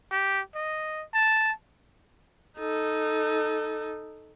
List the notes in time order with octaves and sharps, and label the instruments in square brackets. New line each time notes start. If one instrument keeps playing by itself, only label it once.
[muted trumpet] G4
D#5
A5
[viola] D#4 A4